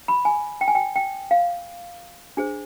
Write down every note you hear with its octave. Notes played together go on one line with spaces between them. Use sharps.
B5
G#5
G5
G#5
G5
G5
F5
D4 G#4 C5